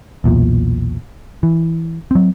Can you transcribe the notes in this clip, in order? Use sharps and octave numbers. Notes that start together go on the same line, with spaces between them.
B1 E2 A#2
E3
F#3 C4